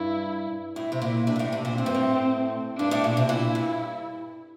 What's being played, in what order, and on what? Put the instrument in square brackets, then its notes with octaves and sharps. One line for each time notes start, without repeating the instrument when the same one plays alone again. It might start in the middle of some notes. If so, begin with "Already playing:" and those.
Already playing: [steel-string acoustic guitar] G2 [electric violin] E4
[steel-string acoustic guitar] A2 [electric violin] E4
[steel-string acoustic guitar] C3
A#2
[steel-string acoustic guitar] C3 [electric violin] D4
[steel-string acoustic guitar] A#2
A2
C3
A#2
[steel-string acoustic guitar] A2 [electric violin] C4
[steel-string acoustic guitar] G2
A2
[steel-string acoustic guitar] G2 [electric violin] D4
[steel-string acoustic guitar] A2
A#2
C3
[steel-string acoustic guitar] A#2 [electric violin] E4
[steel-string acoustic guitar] G2